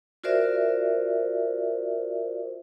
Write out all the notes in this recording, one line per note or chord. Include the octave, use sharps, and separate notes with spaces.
F4 F#4 A#4 C5 D5 E5